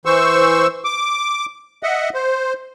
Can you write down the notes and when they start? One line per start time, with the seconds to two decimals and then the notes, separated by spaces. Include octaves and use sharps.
0.05 E3 C5 C#6 E6
0.84 D6
1.83 D#5 E5 F#5
2.14 C5